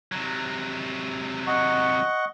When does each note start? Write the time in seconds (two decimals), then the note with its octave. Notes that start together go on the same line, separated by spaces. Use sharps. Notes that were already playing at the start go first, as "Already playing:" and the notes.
0.12 C3 F#3
1.47 D#5 F#5 C#6